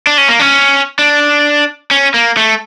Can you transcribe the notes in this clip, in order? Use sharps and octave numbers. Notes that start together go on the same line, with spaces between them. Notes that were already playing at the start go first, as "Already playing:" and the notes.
D4
C#4
A#3
C#4
D4
C#4
A#3
A3